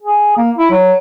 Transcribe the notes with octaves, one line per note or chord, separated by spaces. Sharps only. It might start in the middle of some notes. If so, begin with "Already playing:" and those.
G#4
A#3
E4
F#3